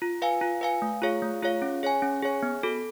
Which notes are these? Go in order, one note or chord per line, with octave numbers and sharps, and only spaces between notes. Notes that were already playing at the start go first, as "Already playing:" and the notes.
F4
B4 F5 G#5
F4
B4 F5 G#5
A3
F4 G#4 C#5 F5
A3
F4 G#4 C#5 F5
C#4
G#4 C#5 G#5
C#4
G#4 C#5 G#5
B3
F#4 A4